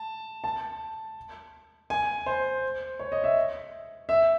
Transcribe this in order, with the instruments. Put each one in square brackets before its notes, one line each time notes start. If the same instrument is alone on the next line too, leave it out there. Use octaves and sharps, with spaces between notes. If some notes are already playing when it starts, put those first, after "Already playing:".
Already playing: [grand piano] A5
A5
G#5
C5
C#5
D#5
E5
E5